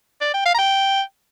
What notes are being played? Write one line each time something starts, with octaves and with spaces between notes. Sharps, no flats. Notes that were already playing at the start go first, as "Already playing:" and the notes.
D5
G5
F5
A#5
G5